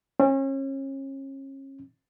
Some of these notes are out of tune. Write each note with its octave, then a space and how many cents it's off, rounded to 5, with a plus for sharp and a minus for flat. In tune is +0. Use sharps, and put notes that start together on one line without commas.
C#4 -35